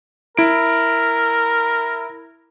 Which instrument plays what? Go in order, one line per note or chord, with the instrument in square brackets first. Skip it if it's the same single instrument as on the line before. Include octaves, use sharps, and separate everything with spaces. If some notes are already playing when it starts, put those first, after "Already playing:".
[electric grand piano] E4 D7 [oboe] A#4